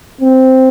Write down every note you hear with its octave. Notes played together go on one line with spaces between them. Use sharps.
C4